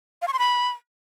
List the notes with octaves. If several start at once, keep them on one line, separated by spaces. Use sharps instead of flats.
F5
C#6
C6
B5